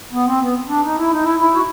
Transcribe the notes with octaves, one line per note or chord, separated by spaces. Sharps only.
B3
C4
B3
D4
D#4
E4
D#4
E4
E4
F#4